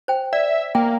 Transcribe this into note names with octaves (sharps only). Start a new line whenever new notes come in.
C5 G5
D5 E5
A#3 G5